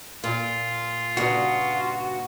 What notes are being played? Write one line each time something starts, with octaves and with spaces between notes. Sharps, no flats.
A#2 F4
G2 A#2 C#3 F#4